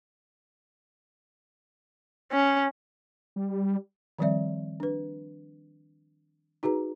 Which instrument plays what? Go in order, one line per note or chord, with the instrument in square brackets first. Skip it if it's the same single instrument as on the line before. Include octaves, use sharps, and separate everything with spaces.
[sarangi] C#4
[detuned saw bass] G3
[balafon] D#3 F3 G3 C4 D5 E5
D4 B4
D#4 F#4 G#4 B4 A#5